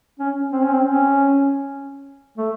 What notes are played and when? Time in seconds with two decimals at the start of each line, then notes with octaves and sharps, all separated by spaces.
0.19 C#4
0.52 C4
0.63 C#4
0.74 C4
0.85 C#4
2.38 A3